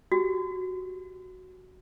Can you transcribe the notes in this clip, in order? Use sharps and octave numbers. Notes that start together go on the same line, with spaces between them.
F#4 G4